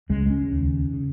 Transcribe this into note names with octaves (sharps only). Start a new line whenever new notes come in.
C#2 C#3 G#3
C#4
D#2 C#3
C#3